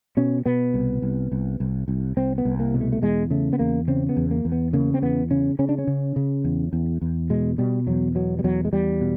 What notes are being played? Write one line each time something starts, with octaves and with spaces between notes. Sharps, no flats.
B2 C#4
B2 B3
C2
C2
C2
C2
C2
C2 C4
B3
C2
A#3
B2
A3
A3
E2 G#3
C#3 A3
B3
E2 A#3
C#3 C4
B3
E2
A#3
E2
B3
C#3 A#3
C4
E2 B3
C#3 C#4
C#3 C#4
D4
C#4
C#3
C#3
E2
E2
E2
B2 G#3
B2 G3
E2 F#3
B2 F#3
G3
E2 F#3
G#3
E2 G3
B2